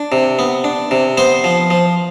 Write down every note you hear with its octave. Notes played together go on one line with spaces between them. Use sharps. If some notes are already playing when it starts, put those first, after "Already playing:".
Already playing: D4
C3
B3
D4
C3
B3 C5 C6
F3
F3